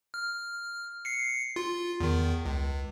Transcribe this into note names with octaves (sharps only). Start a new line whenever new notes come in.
F6
C7 C#7
F4
E2 D#3
C#2